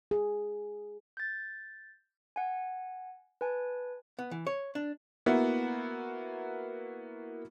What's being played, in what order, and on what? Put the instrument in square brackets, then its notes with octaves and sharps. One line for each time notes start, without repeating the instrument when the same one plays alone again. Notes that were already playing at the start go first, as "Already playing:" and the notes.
[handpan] G#4
[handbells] G6 A6
F#5 G#5
B4 G#5 A5
[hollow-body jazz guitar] B3
E3
C#5
D4
[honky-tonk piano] A#3 B3 E4 F#4